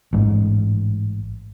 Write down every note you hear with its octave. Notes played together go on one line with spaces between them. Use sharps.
A1 G#2